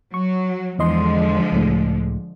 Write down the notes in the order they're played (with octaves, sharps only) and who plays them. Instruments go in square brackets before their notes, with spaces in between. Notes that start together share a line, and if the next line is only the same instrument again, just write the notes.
[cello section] F#3 [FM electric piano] C#6
[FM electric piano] E2 D#5 C6 [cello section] D3 F3 G#3
[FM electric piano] C#2 A2